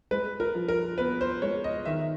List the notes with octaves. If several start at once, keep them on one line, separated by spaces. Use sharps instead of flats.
G#3 B4
A#4
F3
A#4
B3 B4
C5
G#3 C#5
D#5
D#3 E5